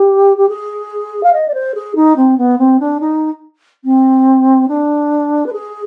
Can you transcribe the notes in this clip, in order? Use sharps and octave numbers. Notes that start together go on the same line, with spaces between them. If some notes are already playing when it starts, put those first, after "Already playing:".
Already playing: G4
G4
G#4
F5
D#5
D5
C5
G#4
D#4
C4
B3
C4
D4
D#4
C4
D4
B4
G#4